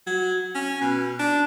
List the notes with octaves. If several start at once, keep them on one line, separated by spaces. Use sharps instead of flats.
F#3
C#4
B2
D4